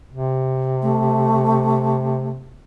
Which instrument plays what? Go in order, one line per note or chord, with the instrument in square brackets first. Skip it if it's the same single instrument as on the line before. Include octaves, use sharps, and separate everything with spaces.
[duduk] C3
[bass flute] A3